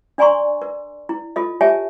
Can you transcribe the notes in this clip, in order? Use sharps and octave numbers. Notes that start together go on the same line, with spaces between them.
D4 D5 G#5 A#5 C6 C#6
A#4
E4
F4 A4 D#5
G4 C#5 D#5 E5 G#5 A5